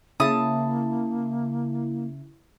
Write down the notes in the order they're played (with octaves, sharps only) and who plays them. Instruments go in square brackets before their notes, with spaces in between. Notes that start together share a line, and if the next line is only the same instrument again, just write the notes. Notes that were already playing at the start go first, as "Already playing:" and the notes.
[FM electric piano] C#3 E4 [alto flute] A#3 [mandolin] A5 D#6